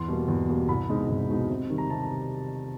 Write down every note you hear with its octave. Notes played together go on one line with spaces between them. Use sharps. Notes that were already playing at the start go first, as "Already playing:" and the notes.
Already playing: E2 C6
B2 G3 A#3
E2
B2 G3 A#3
C2 B5
B2 G#3 C4 D#4
C2
B2 G#3 C4 D#4
C3
D#3 G3
A#5
C3 A5
A#5